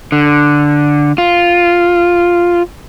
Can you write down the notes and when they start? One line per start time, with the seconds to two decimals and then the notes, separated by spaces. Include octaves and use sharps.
0.12 D3
1.18 F4